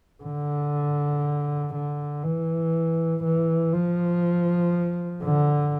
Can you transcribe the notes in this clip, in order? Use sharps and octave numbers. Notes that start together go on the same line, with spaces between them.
D3
D3
E3
E3
F3
D3